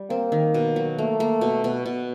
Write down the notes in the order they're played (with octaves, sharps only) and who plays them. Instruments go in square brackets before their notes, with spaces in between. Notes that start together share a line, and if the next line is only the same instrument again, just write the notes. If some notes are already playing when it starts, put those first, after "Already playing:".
Already playing: [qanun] G3
[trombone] A#3 [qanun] C4
[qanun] D#3
B2
F#3
[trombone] A3 [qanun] A#3
[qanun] A#3
B2
B2
B2